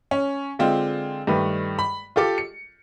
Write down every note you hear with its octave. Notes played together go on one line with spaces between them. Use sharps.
C#4
D3 G#3 C4 F4
G2 D#3 A3 B4
B5
F4 G4 A4 D6
C#7